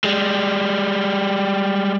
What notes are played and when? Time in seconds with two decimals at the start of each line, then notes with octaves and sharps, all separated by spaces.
0.04 G3 G#3